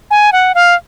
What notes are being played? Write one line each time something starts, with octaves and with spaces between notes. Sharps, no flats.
G#5
F#5
F5